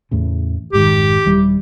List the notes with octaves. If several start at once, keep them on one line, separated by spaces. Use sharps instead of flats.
E2 A2 C#3
F1 G#2 D#3 G4
D#1 E3 G3